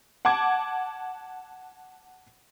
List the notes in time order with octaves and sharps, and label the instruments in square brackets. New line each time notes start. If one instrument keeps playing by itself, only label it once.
[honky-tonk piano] F#5 A5 D6 G#6